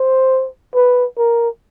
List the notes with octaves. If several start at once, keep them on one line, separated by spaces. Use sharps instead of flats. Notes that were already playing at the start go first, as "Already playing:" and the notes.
Already playing: C5
B4
A#4